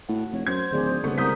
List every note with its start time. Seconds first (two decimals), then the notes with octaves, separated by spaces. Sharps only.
0.09 A2 F#4 F#5
0.32 F1 C#5
0.47 F#2 C5 G#6
0.72 D1 D#3 G#4 D5
1.04 G1 C#3 A3 B3 C4 G4
1.18 C2 G3 G#3 A#4 F#5 D#6 G6 B6